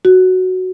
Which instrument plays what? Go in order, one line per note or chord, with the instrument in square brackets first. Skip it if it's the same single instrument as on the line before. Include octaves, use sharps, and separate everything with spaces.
[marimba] F#4